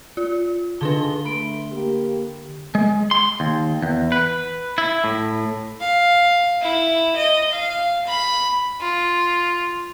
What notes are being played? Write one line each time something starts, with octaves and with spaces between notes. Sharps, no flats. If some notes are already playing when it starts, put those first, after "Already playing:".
F4
D3 D4 D#4 F4 G#4 C6 G7
A3 B5 D7
A#3 G4
G#3
C6
D#2
E2
B4
E4
A2
F5
E4
D#5
F5
B5
F4